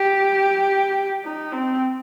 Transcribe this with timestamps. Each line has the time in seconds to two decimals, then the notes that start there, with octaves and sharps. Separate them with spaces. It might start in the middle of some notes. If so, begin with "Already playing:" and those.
Already playing: G4
1.24 D#4
1.52 C4